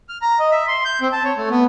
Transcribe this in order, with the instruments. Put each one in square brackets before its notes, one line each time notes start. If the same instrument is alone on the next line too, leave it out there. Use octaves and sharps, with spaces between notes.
[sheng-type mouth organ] F6
A#5
D#5
E5
C6
G6
C4
A5
C#5
A3
B3